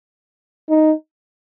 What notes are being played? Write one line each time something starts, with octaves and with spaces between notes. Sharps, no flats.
D#4